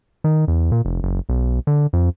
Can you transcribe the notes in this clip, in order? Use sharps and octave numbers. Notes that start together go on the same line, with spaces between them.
D#3
E2
A#2
F1
F#1
B1
D3
F2